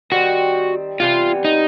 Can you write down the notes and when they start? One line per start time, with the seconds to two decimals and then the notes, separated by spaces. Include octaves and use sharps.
0.11 D#3 G3 C4 F#4
1.00 C3 E3 G3 B3 F4
1.44 D#4